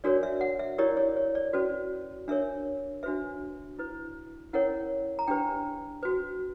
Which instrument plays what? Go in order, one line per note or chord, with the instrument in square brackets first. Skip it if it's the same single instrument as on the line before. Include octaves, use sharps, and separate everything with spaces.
[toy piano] D4 F#4 A#4 C#5 D5
E5
F#5
E5
E4 G4 A#4 C#5 D5
C#5
C#5
D5
C#4 F#4 B4
D4 A#4 C#5 E5
D4 F#4 B4 E5
E4 B4
C#4 E4 A#4 C#5 F#5
A#5
D4 G4 B4 G5
F#4 B4